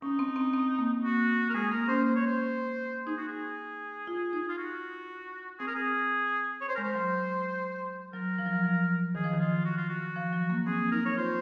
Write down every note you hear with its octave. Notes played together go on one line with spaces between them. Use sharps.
C#4 D#4
C4
C4
C4
A#3
F#4
A#4
G#3 G#4
A#3 A#4
C#4 C5
C5
C#5
C5
D#4 G#4
F#4
G#4
F4
D#4
F4
F#4
C4 G#4
A#4
G#4
C#5
C5
G#3 A#4
C5
F#3
F#3 A#4
F3
F#3
F3
F3
D#3 G#4
F3
D#3
F4
F#4
F4
F#4
F3
F#3
A#3
C4 G#4
D#4 A#4
C#5
F4 C5